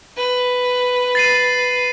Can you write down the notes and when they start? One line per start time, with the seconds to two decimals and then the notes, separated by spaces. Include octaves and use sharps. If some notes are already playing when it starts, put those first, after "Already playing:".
0.17 B4
1.15 A6 C7 D#7